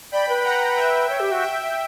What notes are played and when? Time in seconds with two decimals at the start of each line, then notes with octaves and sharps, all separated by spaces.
0.12 D5 G5 B5
0.28 B4
0.44 F#5 A#5
0.77 E5 G5
1.09 C#5
1.19 G4
1.31 F#4
1.41 E5 G5